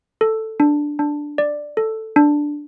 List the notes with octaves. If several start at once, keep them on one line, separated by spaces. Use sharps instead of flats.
A4
D4
D4
D5
A4
D4